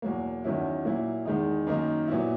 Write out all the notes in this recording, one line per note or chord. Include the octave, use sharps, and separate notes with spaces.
E2 B2 F#3 A#3
E2 D#3 F#3 C#4 E4
A#2 F#3 A#3 E4
E2 D#3 G#3 D#4
F#2 D#3 A#3 D#4
A#2 F#3 B3 E4